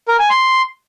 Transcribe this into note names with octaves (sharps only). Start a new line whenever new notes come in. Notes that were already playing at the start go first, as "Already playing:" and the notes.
A#4
G#5
C6